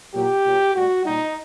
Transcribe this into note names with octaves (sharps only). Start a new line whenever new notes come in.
A#2 F#3 G4
A#2 F#3
A2 G3 F#4
A#2 G3 D#4